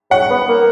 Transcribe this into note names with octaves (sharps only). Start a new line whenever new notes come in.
F#3 F#5
B3
A#3